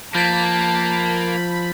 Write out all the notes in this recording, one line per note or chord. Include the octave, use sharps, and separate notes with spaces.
F3 A#3 A5 B5 G6 A6 B6